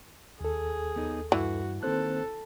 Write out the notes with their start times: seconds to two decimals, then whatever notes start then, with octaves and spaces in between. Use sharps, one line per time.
0.41 D#2 G#4 A4
0.96 B3 D#4
1.32 G2 E3 F#4
1.83 D#3 A#3 C4 A4 C5 F#6